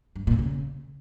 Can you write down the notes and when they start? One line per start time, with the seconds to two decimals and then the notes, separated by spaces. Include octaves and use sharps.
0.16 G2
0.27 A#2
0.39 C#3